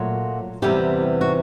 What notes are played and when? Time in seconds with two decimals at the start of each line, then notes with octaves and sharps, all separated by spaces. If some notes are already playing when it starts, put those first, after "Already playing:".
Already playing: A#2 F#3 A3
0.62 E2 C3 E3 G3 G4
1.21 F#4